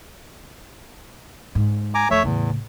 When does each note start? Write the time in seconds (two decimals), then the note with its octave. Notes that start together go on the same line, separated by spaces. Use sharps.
1.55 G#2
1.95 G#5 A#5 D6
2.11 F2 A3 C#5 E5
2.24 E2 A2 C#3